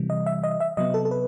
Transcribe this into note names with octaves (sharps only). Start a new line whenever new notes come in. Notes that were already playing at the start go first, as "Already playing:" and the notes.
Already playing: C3 E3 G3
D#5
E5
D#5
E5
C3 F#3 B3 D#5
A4
A4
B4